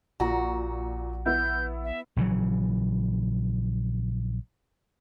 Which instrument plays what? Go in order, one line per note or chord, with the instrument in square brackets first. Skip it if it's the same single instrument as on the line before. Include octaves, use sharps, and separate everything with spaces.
[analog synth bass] A#1 [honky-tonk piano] A#2 A#5 [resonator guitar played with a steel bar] F#4
[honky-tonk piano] B3 E4 [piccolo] G6
[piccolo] E5
[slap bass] A#1 C#3 E3 F#3